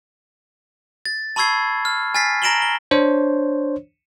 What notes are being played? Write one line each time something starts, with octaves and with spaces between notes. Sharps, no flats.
A6
A5 B5 C#6 E6 G#6 C7
F6
G#5 F6 A6 B6 C7
A#5 A#6 D7 E7 F#7 G7
G7
D4 C5 C#5